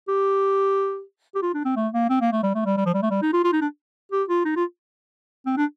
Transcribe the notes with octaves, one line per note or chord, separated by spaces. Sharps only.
G4
G4
F4
D4
C4
A3
A#3
C4
A#3
A3
G3
A3
G3
G3
F3
G3
A3
G3
D#4
F4
F4
D#4
D4
G4
F4
D#4
F4
C4
D4